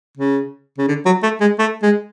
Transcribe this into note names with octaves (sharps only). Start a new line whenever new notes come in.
C#3
C#3
D3
F#3
A3
G#3
A3
G#3